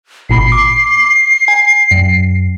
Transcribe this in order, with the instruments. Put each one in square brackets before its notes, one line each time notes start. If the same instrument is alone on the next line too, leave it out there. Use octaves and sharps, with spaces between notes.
[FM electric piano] G#1 A#2 B5 [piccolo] C7
[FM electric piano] D6
G#5
F#2